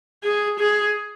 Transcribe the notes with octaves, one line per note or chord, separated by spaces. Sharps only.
G#4
G#4